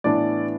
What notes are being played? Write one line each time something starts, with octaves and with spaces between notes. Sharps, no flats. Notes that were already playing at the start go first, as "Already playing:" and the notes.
A2 E3 B3 D4 D5